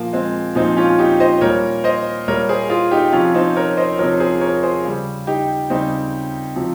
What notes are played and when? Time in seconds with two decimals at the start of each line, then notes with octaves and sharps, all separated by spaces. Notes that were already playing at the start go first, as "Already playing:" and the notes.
Already playing: A#2 F3 A#3
0.13 G#3 C4
0.55 A#2 F3 C4 D#4
0.77 C#4 F4
0.98 D#4 G4
1.20 C5 D#5
1.41 A#2 G3 A#4 C#5
1.84 C5 D#5
2.28 A#2 G3 A#4 C#5
2.49 G#4 C5
2.70 F4 G#4
2.91 D#4 G4
3.12 C3 F3 C#4 F4
3.34 C4 D#4
3.56 A#4 C#5
3.77 C5 D#5
3.99 C3 F3 A#4 C#5
4.20 G#4 C5
4.41 A#4 C#5
4.63 G#4 C5
4.85 C#3 G3
5.27 D#4 G4
5.70 C#3 G3 C4 D#4
6.56 C3 F3